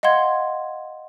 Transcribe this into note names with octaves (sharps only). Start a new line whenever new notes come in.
D#5 F5 F#5 C6 G#6